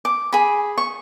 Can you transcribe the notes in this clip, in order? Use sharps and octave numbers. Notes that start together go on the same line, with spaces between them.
D6
G#4 B5
C#6